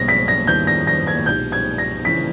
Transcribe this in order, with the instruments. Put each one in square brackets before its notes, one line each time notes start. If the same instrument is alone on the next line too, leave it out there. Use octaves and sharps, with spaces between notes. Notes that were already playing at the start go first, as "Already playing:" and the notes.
Already playing: [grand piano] B1 B2 G3 [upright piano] A#6
[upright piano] B6
A#6
[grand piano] D#2 D#3 G3 B3 E4 [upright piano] G6
[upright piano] A#6
A#6
G#6
[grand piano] B1 A#2 G#3 D#4 G4 [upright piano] G6
[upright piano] G#6
A#6
[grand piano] C#3 E3 A#3 E4 [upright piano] B6